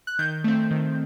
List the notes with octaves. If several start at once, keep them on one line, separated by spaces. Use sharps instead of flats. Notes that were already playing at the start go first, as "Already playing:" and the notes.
F#6
D#3 G6
A3 C4
D#3